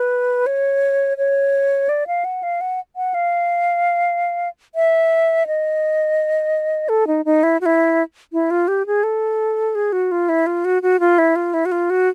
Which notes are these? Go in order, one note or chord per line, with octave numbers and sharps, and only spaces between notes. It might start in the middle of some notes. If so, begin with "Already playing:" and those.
Already playing: B4
C#5
C#5
D5
F5
F#5
F5
F#5
F#5
F5
E5
D#5
A4
D#4
D#4
E4
F#4
E4
E4
F4
G4
G#4
A4
G#4
F#4
F4
E4
F4
F#4
F#4
F4
E4
F4
E4
F#4
F4
F#4